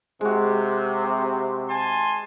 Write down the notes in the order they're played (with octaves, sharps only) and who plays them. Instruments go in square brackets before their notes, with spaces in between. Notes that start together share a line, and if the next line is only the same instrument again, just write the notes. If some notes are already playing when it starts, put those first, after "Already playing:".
[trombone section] C3 [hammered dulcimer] G#3 F#4
[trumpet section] G#5 A5 C6